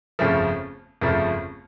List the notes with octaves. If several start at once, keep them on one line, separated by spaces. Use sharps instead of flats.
G1 F2 C#3 F3 A3
G1 F2 C#3 F3 A3